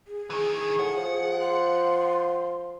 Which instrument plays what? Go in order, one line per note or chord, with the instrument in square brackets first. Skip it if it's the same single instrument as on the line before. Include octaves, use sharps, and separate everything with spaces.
[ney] G#4
[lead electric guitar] D#3 E3
[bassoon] A2 [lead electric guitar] F#5
[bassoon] F3
[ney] C6